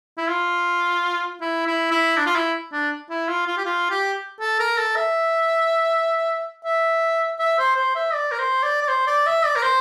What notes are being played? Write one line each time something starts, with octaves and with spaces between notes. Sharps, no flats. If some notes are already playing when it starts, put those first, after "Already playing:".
E4
F4
E4
E4
E4
D4
F4
E4
D4
E4
F4
F4
G4
F4
G4
A4
A#4
A4
E5
E5
E5
C5
C5
E5
D5
A#4
C5
D5
D5
C5
D5
E5
D5
A#4
C5